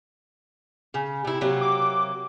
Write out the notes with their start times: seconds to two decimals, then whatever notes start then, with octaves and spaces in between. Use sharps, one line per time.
0.94 C#3
1.25 C3 E4
1.41 C3 F#3 A#3
1.61 D6